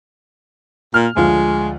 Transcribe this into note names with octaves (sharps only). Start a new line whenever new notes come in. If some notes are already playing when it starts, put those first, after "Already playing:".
A#2 F6
D2 F3 G#3 F4